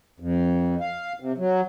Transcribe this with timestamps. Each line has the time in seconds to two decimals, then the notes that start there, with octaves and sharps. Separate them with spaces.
0.20 F2
0.80 F5
1.20 C3
1.38 F#3